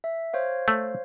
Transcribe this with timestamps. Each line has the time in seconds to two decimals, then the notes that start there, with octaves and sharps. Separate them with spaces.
0.04 E5
0.33 C5 C#5 F5
0.68 A3